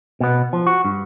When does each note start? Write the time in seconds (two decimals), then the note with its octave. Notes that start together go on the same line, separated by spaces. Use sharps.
0.20 B2 B3
0.53 F3
0.67 F#4
0.85 G2